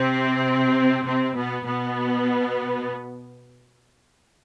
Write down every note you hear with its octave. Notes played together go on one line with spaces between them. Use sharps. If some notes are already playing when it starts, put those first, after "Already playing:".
Already playing: C3 C4
C3 C4
B2 B3
B2 B3